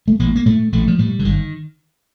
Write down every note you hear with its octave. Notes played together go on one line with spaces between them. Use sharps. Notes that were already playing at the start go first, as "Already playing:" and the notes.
A3
A1 A#3
A#3
A2 A3
A1 A3
F3
A2 G3
D3
G1 D#3